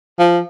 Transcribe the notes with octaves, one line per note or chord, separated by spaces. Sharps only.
F3